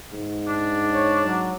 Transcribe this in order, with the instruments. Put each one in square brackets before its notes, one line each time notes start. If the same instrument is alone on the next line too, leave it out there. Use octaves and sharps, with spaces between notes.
[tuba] G#2
[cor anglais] D4
[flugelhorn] C#5
F#3